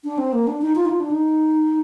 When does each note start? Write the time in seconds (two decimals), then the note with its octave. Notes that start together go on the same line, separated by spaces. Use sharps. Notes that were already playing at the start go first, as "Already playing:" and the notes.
0.04 D4
0.18 C4
0.33 A#3
0.47 D4
0.61 D#4
0.75 F4
0.85 D#4
0.89 F4
1.00 D4
1.11 D#4